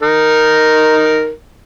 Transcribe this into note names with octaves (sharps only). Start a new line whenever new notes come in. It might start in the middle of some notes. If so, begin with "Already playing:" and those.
D#4 A#4